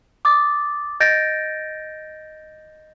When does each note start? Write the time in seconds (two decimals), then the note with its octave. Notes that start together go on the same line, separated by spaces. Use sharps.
0.25 D6 D#6 A6
1.00 D#5 G6 A6 A#6 D7